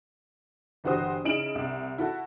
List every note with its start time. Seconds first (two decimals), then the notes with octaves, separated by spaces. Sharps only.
0.84 G1 E3 F#4 G4 C5 D#6
1.24 C#3 D#4 E4 D7 E7 F#7
1.55 C2
1.98 E4 F#4 A4